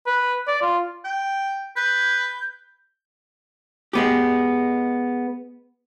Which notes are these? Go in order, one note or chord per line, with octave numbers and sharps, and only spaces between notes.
B4
D5
F4
G5
B4 G6
G#3 B3 G4